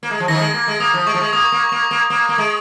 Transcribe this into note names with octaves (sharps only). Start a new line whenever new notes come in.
A#3
G#3
F3
D#3 A#6
F3
G#3
A#3
G#3
A#3 D#6
F3
G#3 C#6
F3
G#3
A#3 D#6
C#6
A#3
A#3 C#6
A#3
A#3
A#3
G#3